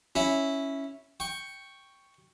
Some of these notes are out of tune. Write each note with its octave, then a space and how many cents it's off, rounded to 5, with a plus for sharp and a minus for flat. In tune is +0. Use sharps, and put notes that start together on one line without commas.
C#4 +0 E4 -5
G5 +0 C#6 +0